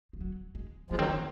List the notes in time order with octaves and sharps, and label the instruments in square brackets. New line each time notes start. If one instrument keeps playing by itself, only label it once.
[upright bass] F3
F#3
G#3
[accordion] F3 G#3 [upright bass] A#3
[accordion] D#3 F#3 [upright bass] C4
[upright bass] A#3